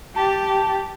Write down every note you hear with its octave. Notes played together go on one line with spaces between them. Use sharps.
G4 A5